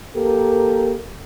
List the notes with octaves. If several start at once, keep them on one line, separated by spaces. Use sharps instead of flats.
A#3 G4 A4 A#4